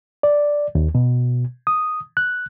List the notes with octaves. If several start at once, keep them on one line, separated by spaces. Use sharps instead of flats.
D5
D#2
B2
D#6
F#6